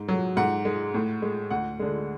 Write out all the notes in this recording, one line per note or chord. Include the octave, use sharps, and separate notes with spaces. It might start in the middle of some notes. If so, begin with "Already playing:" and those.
Already playing: G#2
F#3
G#2 F#5
G#3
A2
G#3
D2 F#5
D3 G#3